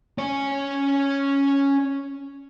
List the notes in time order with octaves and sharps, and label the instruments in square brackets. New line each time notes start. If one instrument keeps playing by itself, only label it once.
[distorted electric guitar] C#4 C#5